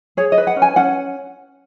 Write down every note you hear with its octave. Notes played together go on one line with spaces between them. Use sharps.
G#4 C#5
D#5
B4
F#5
C#4
G#5
C#4 F#5